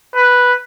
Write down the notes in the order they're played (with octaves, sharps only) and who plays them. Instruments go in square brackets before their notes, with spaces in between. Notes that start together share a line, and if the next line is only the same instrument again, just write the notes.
[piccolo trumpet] B4